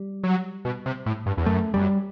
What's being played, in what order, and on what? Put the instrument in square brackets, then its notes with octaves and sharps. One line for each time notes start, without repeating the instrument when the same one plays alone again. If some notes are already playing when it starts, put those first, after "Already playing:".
Already playing: [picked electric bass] G3
[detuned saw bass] F#3
B2
C3
A2
G2
E2
[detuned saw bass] F#2 [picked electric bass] A3
[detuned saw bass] F#2 [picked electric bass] G3